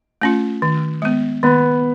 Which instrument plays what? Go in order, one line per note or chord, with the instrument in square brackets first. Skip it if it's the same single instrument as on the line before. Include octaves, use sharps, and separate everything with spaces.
[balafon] A3 C#4 F4
D#3
G#3 B3
[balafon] D#3 [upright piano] B3